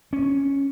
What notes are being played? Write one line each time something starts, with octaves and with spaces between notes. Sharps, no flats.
C#4